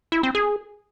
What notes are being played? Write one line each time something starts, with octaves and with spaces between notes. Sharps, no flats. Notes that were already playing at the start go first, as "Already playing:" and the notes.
E4
C4
G#4